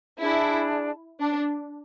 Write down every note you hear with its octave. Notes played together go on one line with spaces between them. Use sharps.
D4 E4 G#4 D5 A5
D4